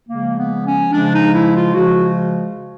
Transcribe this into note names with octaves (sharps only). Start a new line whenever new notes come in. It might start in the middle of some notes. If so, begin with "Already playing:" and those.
C#3 F3 G#3 A#3
B3
C#4
C#3 F3 G#3 D4
D#4
E4
F4
C#3 F3 G#3 F#4